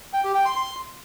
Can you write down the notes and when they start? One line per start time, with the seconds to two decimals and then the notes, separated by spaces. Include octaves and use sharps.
0.13 G5
0.24 G4
0.35 G5
0.45 C6
0.56 C6